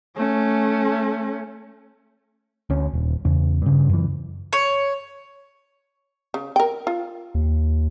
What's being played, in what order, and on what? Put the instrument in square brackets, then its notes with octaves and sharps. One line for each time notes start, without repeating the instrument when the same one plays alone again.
[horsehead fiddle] A3 C#4
[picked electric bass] D2 C#4
D#1
E2 C#3
G2 C#3
F#2 E3
[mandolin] C#5
[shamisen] C#3
A#4 G5
F4
[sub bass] D#2